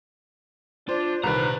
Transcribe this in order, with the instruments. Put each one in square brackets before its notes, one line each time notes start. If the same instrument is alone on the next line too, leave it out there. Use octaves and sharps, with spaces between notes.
[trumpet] D4 [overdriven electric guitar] F4 [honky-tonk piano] C5
[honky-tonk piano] C2 D#3 [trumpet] B4 [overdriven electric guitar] C5 A#5